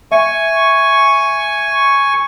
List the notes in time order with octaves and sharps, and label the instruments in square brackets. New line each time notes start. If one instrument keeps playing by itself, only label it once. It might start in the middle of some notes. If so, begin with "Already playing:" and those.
[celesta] E5 [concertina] G#5 C#6